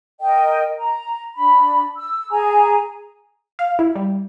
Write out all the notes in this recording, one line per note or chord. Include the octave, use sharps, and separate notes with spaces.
A#4 D#5 G5
A#5
D4 B5
E6
G#4 G#5 A#5
F5
E4
G3